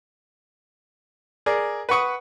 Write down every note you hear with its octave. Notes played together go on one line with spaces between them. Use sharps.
G#4 A#4 D5
B4 F#5 C#6 D#6